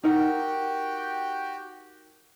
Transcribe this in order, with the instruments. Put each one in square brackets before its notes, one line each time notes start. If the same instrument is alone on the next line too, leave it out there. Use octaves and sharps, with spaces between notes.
[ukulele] D#4 A#4 F#5 [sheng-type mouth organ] F#4 G4 G5